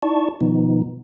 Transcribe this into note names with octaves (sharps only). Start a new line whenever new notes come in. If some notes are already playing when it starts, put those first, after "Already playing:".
D#4 E4 D5 A5 C#6
B2 D#3 F3 B3 D#4